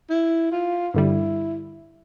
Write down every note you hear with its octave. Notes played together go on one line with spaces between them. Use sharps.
E4
F4
G2 D3 G3 E4